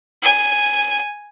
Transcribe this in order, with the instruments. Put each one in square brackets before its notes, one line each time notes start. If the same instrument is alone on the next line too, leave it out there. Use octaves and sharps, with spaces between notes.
[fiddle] G#5